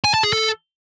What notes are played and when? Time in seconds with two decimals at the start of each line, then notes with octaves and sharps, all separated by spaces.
0.04 G#5
0.14 A5
0.23 G#4
0.33 A4